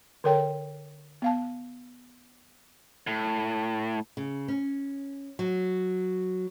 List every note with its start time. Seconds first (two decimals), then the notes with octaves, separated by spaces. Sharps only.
0.24 D3 A4 A#4 C#5 G5 A#5
1.22 B3 F5 A5
3.07 A2
4.17 C#3
4.48 C#4
5.39 F#3